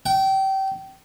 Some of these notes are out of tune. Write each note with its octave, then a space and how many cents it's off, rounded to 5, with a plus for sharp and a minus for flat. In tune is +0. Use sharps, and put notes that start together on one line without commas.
G5 -25